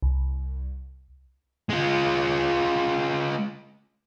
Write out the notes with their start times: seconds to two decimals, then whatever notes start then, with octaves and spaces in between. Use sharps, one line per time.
0.02 C2
1.70 G#3 F4